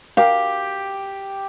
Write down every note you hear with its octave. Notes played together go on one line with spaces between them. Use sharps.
G4 A#4 F5